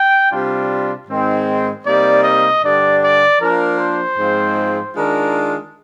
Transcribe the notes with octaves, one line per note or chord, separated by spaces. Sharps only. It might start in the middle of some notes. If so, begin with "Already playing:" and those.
Already playing: G5
C3 G3 D4 F4
G#2 D#3 G#3 C4
C3 G3 A#3 D#4 D5
D#5
G2 D3 G3 D4 D5
D5
F3 A#3 D4 A#4
C5
G#2 F3 G#3 C4 F4
D#3 G#3 D4 F4 A#4